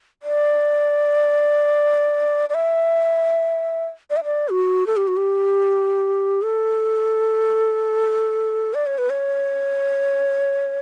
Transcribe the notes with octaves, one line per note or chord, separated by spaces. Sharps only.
D5
D5
E5
D5
E5
D5
F#4
A4
G4
F#4
G4
A4
D5
C#5
B4
C#5